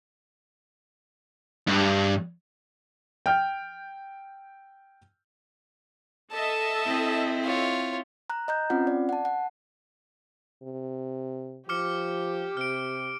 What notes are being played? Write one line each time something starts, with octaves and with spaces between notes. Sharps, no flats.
G2
G5 F6 G6
A4 D#5 E5 A5
C4 E4
F4 C#5
A#5 F#6
D#5 A#5 G6
C4 C#4 F4 F#5
D5
F#5 A5
F#5
C3
F3 G4 D6 F6 C#7
C3 F6 D7